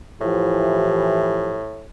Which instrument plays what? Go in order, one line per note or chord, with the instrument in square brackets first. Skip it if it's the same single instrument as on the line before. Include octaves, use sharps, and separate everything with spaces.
[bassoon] A2 [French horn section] E3 F3 G4